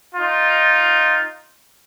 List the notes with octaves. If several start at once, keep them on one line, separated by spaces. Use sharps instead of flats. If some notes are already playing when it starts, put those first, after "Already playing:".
D#4 F4